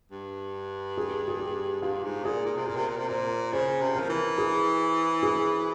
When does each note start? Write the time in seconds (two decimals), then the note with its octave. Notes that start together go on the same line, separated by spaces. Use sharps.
0.11 G2
0.98 G#4
1.28 G#4
1.40 G4
1.82 G2 F4
2.04 G#2
2.24 A#2 G#4
2.46 A#2
2.57 C3
2.66 A#2 A#4
2.76 C3
2.87 A#2
2.98 C3
3.08 A#2 C5
3.53 C#3 C5
3.81 C3
3.95 F3 A#4
4.09 E3
4.38 G#4
5.23 G#4